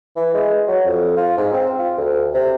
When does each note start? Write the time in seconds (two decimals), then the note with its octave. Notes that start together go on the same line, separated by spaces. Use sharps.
0.16 E3
0.35 G#3
0.68 F#3
0.85 F2
1.17 F4
1.38 G#2
1.54 C4
1.79 F4
1.98 D2
2.34 C3